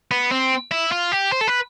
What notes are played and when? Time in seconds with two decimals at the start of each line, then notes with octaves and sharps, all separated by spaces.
0.11 B3
0.32 C4
0.71 E4
0.92 F4
1.12 G4
1.32 C5
1.41 A4
1.47 B4